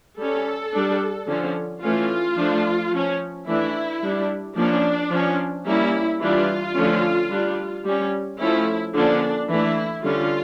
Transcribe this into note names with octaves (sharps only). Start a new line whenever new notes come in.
G3 C#4 A4
G3 D4
D3 F3 C#4
E3 A3 C#4 F4
F3 A3 D4
F3 C#4
E3 A3 D4 E4
G3 D4
F3 A#3 C#4 D4
F3 C#4
G3 A#3 C#4 E4
E3 G3 D4 F4
D3 F3 A3 C#4
G3 D4
G3 C#4
F3 A3 C#4 E4
D3 F3 A#3 C#4 D4
E3 A3 D4 E4
D3 G3 C#4 F4